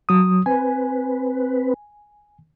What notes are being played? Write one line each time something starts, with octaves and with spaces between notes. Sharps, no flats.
F#3 D#6
C4 B4 G#5